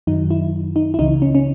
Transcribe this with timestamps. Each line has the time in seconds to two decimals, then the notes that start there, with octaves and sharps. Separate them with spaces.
0.07 F#2 D#3 F#3 D#4
0.30 E4
0.76 D#4
0.94 E4
0.99 C#2 C#3 E3 D#4
1.22 C#4
1.35 C#4